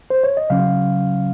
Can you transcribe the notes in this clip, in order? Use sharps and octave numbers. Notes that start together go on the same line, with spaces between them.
C5
C#5
D#5
C#3 F#3 C#4 F5